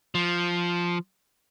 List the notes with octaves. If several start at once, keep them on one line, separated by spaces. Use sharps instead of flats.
F3